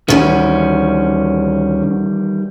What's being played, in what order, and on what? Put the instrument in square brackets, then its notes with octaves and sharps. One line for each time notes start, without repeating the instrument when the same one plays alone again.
[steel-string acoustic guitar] D2 C#4 [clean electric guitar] D#3 E3 G3